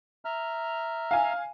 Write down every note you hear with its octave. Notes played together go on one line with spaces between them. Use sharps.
E5 A#5 F6
F5 G#5